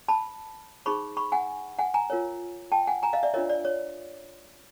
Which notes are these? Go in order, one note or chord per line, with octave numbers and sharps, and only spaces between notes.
A5 B5
D#4 G#4 C5 B5 C#6
B5 C#6
F#5 G#5
F#5 G#5
G#5 A#5
F4 A#4 C#5
G5 A5
F#5 G#5
G#5 A#5
D#5 F5
D5 E5
D4 F4 A#4 C#5 D#5
D5
C#5